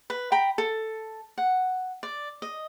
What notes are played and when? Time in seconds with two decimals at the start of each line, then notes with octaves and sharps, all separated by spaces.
0.10 B4
0.32 G5 A#5 B5
0.58 A4
1.38 F#5
2.03 D5
2.42 D#5